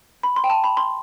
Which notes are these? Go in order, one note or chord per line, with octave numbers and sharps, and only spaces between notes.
B5
C6
G5
A5
B5
C6